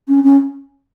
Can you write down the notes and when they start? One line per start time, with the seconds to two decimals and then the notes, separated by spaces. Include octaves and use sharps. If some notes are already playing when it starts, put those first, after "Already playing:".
0.08 C#4
0.24 C#4